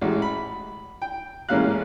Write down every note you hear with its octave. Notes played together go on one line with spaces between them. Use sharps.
A1 G#3 F#4
B5
G5
A1 G#3 A#3 C#4 F5 F#6